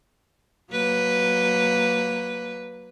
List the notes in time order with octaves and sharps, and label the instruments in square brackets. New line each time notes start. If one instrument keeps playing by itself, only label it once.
[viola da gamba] F#3 A#3 B4